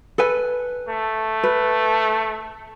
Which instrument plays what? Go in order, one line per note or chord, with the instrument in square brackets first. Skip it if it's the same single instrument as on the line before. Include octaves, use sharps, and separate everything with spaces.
[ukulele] A4 B4 G#5
[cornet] A3
[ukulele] B4